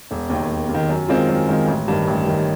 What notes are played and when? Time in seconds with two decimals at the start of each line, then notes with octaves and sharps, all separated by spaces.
0.11 E1
0.29 D#2 D#3
0.50 E1
0.69 D#2
0.74 D#3
0.89 F#2
1.08 D#3 G#3 C4 F4
1.29 F#2
1.48 D#3 G#3 C4 F4
1.68 A1
1.88 G2 D#3
2.08 A1
2.27 G2 D#3